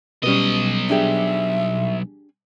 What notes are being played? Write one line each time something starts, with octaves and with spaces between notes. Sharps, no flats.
B1 B2 G3 C#4 B4 D#5
D4 G4 G#4 E5